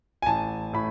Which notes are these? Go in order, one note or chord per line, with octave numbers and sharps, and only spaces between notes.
G#5
A1 A5
A2 B5